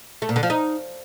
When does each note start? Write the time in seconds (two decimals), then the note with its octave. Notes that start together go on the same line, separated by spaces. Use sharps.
0.22 A3
0.29 A#2
0.36 D3
0.43 F3
0.50 D#4